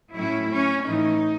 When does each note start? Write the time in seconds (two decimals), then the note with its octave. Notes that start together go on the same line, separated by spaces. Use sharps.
0.15 A2 F#3 A3 C#4 E4
0.49 C#4
0.84 A2 E3 A3 C#4 D#4